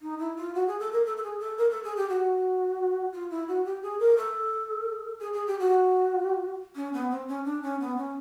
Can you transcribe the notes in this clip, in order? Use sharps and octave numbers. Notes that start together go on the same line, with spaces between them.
D#4
E4
F4
F#4
G#4
A4
A#4
A4
A4
G#4
A4
A#4
A4
G#4
G4
F#4
F4
E4
F#4
G4
G#4
A#4
A4
G#4
G#4
G4
F#4
C#4
B3
C4
C#4
D4
C#4
B3
C#4